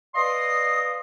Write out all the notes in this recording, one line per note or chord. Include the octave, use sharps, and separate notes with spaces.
B4 D5 D#5 F5 C6 D#6